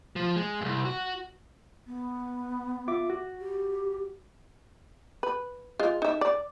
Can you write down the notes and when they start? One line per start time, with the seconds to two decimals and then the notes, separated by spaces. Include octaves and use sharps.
0.16 F3
0.36 G#3
0.61 C2 G2
0.85 F#4
1.87 B3
2.88 F4 E5 D6
3.10 F#4
3.40 G4
5.23 B4
5.79 G#3 F4
6.02 D#4 E5
6.21 D5